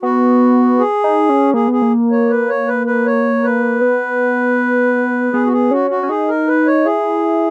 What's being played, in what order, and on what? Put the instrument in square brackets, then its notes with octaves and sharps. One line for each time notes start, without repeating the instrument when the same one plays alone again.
[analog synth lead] B3 [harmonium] F#4
[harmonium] G#4
[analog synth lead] D#4
C#4
[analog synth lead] A#3 [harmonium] G#4
[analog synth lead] B3
[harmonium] G#4
[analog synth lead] A#3
[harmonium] C#5
B4
C#5
B4
B4
C#5
B4
[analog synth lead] B3
[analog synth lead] B3 [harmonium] G#4
[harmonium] F#4
G#4
[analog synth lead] C#4 [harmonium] F#4
[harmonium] F#4
[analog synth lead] C#4
[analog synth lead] D#4 [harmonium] G#4
[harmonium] A#4
B4
C#5
[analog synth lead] E4 [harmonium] G#4